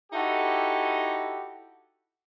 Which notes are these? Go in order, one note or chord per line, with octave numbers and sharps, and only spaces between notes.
D#4 E4 F#4 G4 A4